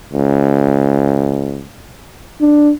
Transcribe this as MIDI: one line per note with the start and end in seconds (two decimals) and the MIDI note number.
0.13 1.66 37
2.41 2.72 62